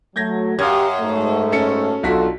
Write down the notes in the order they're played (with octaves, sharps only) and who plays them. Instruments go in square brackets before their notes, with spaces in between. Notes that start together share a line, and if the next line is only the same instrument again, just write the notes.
[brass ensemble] F#3 A3 [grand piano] G6 G#6 A#6
[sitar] F#2 [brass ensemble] G4 [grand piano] F5 F6 G#6
[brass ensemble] G#2 A3
[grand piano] C#4 A4 C#7
[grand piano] B1 F#4 B6 [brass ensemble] D4 F4 A4